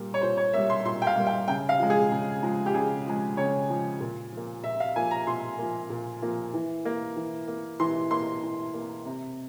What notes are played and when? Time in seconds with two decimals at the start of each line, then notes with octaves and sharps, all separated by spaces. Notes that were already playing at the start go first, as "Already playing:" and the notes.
Already playing: A#2 G3 A#3
0.14 C#5
0.21 A#2 C5
0.37 C#5
0.53 G3 A#3 E5
0.70 C6
0.85 A#2 C6
1.02 G5
1.07 F5
1.17 G3 A#3
1.27 G5
1.48 C#3 G5
1.69 F5
1.80 F3 G#3
1.90 G#4
2.11 C#3
2.43 F3 G#3
2.66 G4
2.74 C#3 G#4
3.07 F3 G#3
3.37 C#3 C#5
3.70 F3 G#3
4.00 A#2
4.32 F3 A#3
4.64 A#2 E5
4.80 F5
4.96 F3 A#3 G#5
5.11 A#5
5.27 A#2 C6
5.59 F3 A#3
5.90 A#2
6.22 F3 A#3
6.54 E3
6.85 A#3
7.16 E3
7.48 A#3
7.80 E3 C6
8.11 A#3 C6
8.43 E3
8.74 A#3
9.06 C3